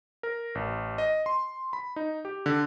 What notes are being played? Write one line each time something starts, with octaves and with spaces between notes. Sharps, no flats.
A#4
A1
D#5
C6
B5
D#4
G4
D3